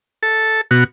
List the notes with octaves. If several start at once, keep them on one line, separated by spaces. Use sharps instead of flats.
A4
B2 F#4